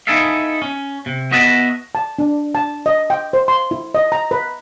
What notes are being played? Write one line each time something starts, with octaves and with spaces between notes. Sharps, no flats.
D#4 E4 G#4 A4 E5 F5
C#4
C3
B3 F#4 D#5 E5 F#5 A5
A5
D4
A5
D#5
G5
C5
C6
E4
D#5
A#5
B4